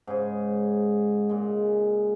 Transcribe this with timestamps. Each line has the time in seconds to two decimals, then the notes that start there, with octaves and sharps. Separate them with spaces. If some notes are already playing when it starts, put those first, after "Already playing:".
0.07 G#2 C#3 G#4
1.29 A#2 G#3